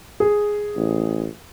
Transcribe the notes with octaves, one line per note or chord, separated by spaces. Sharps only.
G#4
A1